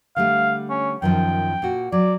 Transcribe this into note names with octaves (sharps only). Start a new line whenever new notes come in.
D3 G3 A3 F5
C#4
F#2 D#3 F3 G5
A#2 F#4
F#3 D5